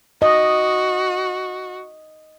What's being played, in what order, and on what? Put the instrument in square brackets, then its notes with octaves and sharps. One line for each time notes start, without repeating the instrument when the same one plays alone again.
[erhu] F#4 [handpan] D#5